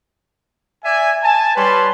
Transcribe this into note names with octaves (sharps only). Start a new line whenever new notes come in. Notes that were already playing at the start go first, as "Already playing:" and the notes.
D5 E5 G#5
G#5 A5
G3 B4 C#5 A5 C6